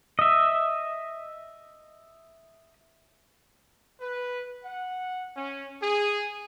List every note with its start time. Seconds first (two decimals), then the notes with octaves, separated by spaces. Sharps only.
0.19 D#5 E5
4.00 B4
4.64 F#5
5.36 C#4
5.82 G#4